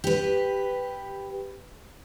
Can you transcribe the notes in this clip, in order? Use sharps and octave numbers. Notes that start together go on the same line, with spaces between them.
G4 B4